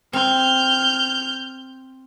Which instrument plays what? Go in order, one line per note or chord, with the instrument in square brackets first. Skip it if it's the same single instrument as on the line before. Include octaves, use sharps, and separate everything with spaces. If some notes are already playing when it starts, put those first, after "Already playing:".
[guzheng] C4 [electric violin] F6 G6